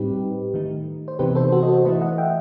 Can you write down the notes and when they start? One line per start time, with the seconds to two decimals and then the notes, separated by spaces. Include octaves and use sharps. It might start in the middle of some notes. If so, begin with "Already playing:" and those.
Already playing: A2 G3 C4 D#4 G4 B4
0.54 D#3 A3 D#4
1.08 C5
1.19 C3 E3 B3 D#4 G4 B4
1.35 A4 C5
1.52 F#4 A4
1.63 D#5
1.68 A4 C5
1.85 E3 A3 E4 B4 D#5
2.01 D#5 F#5
2.18 E5 G5